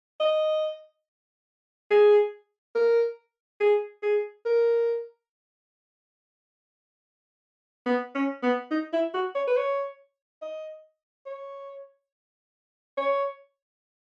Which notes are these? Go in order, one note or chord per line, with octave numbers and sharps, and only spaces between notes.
D#5
G#4
A#4
G#4
G#4
A#4
B3
C#4
B3
D#4
E4
F#4
C#5
B4
C#5
D#5
C#5
C#5